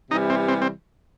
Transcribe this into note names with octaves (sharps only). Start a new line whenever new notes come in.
C3 E3 G3 D#4
C4
C4
C4